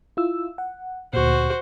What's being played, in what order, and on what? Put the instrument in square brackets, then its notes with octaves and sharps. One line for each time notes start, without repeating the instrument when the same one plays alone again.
[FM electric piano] E4 F4 E6
F#5
[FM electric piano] D2 A#2 [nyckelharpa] F#4 C5